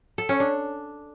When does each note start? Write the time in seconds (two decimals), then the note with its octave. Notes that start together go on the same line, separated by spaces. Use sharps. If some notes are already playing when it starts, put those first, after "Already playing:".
0.18 A4
0.29 C#4
0.40 D4